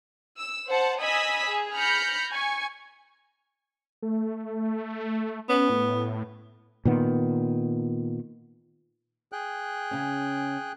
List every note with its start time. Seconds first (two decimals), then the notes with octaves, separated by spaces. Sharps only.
0.38 E6
0.68 C5 F#5 A5
1.00 D#5 G#5 B5 D#6 E6 B6
1.46 G#4
1.76 B5 F6 G6 A#6 C#7
2.31 G#5 C#6
4.03 A3
5.49 B3 C#4
5.70 A2
6.85 A#2 D#3 B3
9.32 G#4 G5 F#6
9.91 C#3 C#4